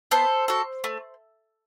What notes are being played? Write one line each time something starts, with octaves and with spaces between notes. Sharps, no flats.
B3 A4 C5
F#4 A4
A3